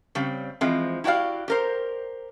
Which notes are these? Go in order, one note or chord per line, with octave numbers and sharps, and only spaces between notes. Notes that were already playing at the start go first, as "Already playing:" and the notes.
C#3 G3 C4
E3 F3 G#3 C4
E4 F#4 G4 D5 F5
G4 A#4 C5